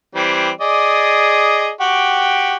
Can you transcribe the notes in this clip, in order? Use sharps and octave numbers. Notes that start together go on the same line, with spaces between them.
E3 G3 C4
G#4 D5 D#5
F#4 G4 G5